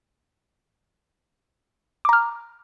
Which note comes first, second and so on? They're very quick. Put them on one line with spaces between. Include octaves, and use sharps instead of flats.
D6 A#5 F6